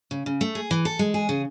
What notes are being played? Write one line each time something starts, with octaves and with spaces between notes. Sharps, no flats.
C#3
C#3
A3
G#4
E3
A4
G#3
G#4
C#3